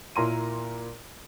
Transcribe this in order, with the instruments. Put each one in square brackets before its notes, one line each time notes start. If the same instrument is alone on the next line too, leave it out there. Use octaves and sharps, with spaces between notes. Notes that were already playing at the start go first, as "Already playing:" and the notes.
[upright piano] A#2 E4 A#4 A#5 C6 D#7